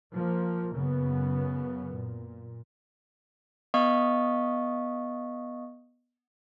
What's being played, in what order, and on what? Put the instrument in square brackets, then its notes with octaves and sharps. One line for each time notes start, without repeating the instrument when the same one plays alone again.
[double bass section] F3 A#3
F#2 C#3 B3
A#2
[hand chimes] B3 D#5 F5 C#6 D#6